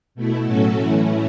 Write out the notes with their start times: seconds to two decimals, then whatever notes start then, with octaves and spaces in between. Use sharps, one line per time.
0.15 B2 A3 E4
0.46 A2 F#3 C#4 F#4 A4
0.77 A2 E3 A3 C#4 E4